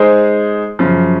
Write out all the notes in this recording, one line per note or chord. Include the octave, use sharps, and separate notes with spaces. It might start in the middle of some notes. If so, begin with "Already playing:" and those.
Already playing: G#3 D#4 G#4 C5
F#2 C#3 F3